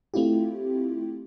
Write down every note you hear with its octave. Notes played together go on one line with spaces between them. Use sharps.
A3 C4 E4 F4 G4